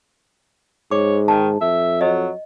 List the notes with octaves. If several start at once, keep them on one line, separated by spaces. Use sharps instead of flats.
G#2 C#5 D6
D#3 A5
F2 E5
F#3 D#5